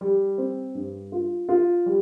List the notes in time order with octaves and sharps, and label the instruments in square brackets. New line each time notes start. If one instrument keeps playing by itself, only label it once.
[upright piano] G3
C4
G2
F4
F4
G3